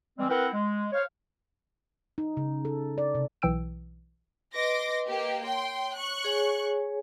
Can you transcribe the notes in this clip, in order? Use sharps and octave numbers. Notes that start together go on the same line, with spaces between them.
E3 G3 G#3 C4
C4 E4 A#4 B4 F#5 G5
G#3
C5 C#5 F5
D#4
C#3
A4
D5
C3
B1 E3 G5 E6 D7
B4 D#5 C6 D6 A#6
A#3 G4
C#5 G5 C6
C#6 F#6
G#4 C#5 G#5